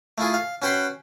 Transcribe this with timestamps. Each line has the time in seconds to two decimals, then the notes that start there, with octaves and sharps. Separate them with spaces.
0.18 A3 E4 F4 G#4
0.34 F5
0.62 C#4 F#4 B4 G5 B5 C6